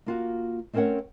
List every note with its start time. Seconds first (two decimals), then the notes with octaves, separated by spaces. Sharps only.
0.06 A#3 F4 F#4
0.73 A3 C4 C#4 A#4 C#5 F#5